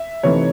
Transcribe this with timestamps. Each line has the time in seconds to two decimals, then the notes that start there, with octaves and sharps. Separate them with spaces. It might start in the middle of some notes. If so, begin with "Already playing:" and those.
Already playing: E5
0.23 C3 E3 A3 D#4 C#5